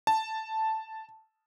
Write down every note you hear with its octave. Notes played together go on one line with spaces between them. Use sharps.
A5